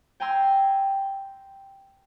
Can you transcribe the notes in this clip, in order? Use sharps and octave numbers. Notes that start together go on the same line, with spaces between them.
G5 G#5 A#5 C6 E6